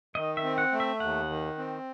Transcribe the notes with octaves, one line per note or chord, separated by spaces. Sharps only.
D#3 D#5
E5
C4
F#5
A3
E5
D#2 F#5
D#3
C4